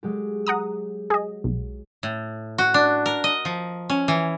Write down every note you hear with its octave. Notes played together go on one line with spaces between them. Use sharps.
F#3 G#3 G4
F#5 A#5 D#6
G#4 D#5
B1
A2
F#4
D4
A#4
D#5
F3
C#4
E3